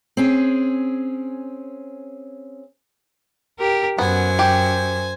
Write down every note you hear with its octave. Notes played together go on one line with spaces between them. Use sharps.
C4 C#4 G#4
G4 A#4
F#2 B3 C5 G#5
G4